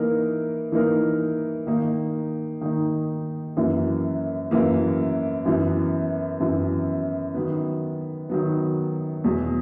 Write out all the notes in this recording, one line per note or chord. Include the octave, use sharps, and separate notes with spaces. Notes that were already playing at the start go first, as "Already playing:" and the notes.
Already playing: E3 A#3 D#4 A#4
E3 A#3 D#4 A#4
D#3 A#3 D#4
D#3 A#3 D#4
F#2 E3 A#3
F#2 E3 A#3
F#2 E3 B3
F#2 E3 B3
D#3 F#3 B3
D#3 F#3 B3
E2 B2 F#3